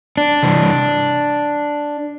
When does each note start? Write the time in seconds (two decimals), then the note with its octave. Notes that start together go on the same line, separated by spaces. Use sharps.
0.17 D4
0.43 C3 E3 G3